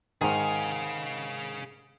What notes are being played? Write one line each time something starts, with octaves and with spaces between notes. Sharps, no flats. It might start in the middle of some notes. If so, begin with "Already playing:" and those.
G#2 D#3 G#4 F5 G#5